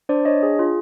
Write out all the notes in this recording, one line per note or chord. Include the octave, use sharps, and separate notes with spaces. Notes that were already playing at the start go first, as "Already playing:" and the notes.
D4 C5 D5
D4 C#5 D#5
G#4
F4